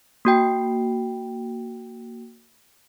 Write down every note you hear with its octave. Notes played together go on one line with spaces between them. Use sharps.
A#3 F#4 G5